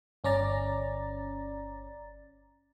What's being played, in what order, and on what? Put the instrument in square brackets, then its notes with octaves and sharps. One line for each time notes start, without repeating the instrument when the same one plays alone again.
[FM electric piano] G1 C#4 D5 A#5 A6